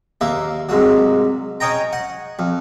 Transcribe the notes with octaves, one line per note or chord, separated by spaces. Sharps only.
D#2 A#3 E5
C2 G#2 F#3
C#4 C#5 D#5 G5 A#5
F#5
F2